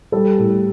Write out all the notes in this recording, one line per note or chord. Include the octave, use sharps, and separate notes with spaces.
G3 A4
A2